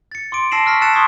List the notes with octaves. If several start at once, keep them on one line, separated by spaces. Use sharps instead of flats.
A6 C#7
C6 D6 D7
A5 E6 A#6 C7 E7 F#7
C#6 E6 F6 A#6 B6
A5 E6 F#6 A6 C#7 E7
C6 C#6 D#6 G#6 B6